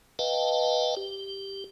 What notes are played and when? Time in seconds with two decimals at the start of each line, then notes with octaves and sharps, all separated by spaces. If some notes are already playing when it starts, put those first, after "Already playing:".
0.19 B4 D#5 F5 G5 A5
0.97 G4